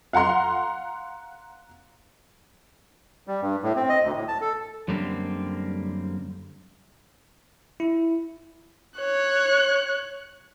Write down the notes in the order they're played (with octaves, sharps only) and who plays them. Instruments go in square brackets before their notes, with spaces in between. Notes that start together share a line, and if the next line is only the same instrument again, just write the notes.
[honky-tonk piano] F5 F#5 A#5 C6
[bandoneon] G3
G2
A2
C4
D#5
D2
A2
A5
A4
[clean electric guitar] F#2 D3 G3 A#3 C4
[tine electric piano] E4
[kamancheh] C#5 F#6